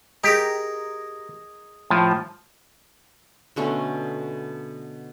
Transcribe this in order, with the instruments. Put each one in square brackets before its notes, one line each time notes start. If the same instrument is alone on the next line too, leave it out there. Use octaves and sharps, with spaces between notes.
[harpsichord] D#4 G#4 A#4 [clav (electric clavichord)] G4
[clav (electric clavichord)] A2 F3
[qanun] B2 D3 A3 C#4